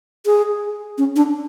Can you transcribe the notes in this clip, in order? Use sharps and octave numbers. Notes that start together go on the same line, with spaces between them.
G#4
C#4
D4